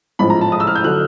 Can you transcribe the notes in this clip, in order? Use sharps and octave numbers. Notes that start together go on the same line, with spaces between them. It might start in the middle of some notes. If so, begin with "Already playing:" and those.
A1 G#2 F3 B5
A#5
A5
D#6
E6
F6
G6
D3 F#3 F#6